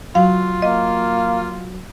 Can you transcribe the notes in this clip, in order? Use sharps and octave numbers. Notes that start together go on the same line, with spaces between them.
F#3 F4 F5
A#3 D#5